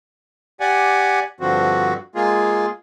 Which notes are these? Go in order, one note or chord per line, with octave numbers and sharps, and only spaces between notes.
G4 D5 F#5 G#5
G2 D3 F3 C4 F#4
G#3 A#3 F4 G#4